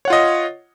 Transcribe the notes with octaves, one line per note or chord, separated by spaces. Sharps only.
F4 C#5 D#5 F#5